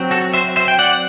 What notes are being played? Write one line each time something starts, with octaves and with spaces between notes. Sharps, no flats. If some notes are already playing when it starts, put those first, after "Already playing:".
Already playing: F#3 C4
F#4 A4
C5 E5
C5 E5
G5
D5 F#5